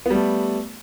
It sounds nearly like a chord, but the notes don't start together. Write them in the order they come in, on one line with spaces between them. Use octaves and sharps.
B3 G3 A3